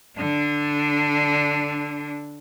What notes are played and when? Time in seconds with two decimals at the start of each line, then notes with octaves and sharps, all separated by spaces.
0.17 D3 D4